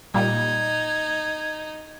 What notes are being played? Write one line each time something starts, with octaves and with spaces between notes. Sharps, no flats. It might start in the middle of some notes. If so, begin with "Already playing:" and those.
A#2 G3 D#4 G#6